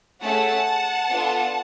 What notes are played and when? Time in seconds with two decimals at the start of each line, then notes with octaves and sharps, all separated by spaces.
0.21 A3 C#4 G#4 F#5 A5
1.09 B3 D4 F4 A4